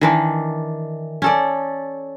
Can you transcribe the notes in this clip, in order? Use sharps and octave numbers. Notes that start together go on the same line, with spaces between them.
D#3 E3 D4
C#4 A4 D5